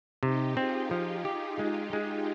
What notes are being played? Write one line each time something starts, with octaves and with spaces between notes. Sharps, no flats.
C3 D#4 G4
C4 F4 G#4
F3
G4
G#3
G#3